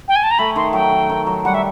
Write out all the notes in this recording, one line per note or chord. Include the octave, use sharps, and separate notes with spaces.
G5
G#5
A5
A#5
A3 B5
D#3 C6
F#3 G5
D#3
D#3
F#3
G3 F#5
E5